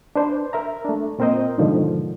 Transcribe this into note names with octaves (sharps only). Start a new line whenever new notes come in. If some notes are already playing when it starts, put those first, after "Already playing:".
D4 B4 C5
A#4 E5 A#5
A3 D4
A#2 C4 A#4 C5 D#5
G#2 B2 D3 D#3 F3